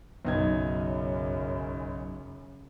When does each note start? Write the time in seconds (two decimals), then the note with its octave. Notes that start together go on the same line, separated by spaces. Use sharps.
0.25 B1 F#2 C#3 D#4 G#6